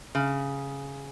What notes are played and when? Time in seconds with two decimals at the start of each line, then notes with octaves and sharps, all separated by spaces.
0.15 C#3